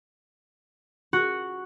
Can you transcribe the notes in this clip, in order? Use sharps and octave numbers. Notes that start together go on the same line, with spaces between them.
F#4